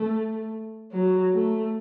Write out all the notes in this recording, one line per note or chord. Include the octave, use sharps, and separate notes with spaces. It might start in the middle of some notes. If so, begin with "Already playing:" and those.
Already playing: A3
F#3
A3